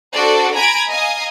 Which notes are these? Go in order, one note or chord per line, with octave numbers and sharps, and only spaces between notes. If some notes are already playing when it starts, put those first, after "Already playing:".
D4 F#4 A4 C5 D5
G#5 A#5 B5 G#6 D7
D#5 F5 G#5 A#5 D#6